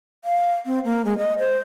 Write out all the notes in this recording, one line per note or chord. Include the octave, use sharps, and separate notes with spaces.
F5
C4
A#3
G#3
D#5
C5